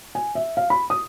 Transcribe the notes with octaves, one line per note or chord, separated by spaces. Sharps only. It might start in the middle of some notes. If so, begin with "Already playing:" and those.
G#5
E5
F5
B5
D#6